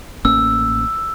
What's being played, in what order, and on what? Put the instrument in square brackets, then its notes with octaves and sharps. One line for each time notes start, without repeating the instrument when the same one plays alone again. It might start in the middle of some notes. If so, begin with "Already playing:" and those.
[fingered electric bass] A1 A#3 C#4 [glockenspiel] E6